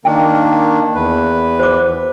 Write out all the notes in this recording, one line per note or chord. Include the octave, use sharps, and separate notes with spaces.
D#3 A#3 D4 G5
E2 B4
C5 D6